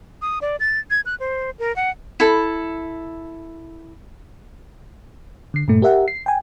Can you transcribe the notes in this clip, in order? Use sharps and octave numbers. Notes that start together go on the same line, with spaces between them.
D#6
D5
A6
G#6
F#6
C5
A#4
F#5
E4 A4
D3 C7
G2 A#2 A3
G4 A#4 E5 F#5
C7
G5 G#5